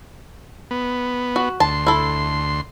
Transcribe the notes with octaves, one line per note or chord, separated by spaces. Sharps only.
B3
F#4
D2 A5 C6
E4 A4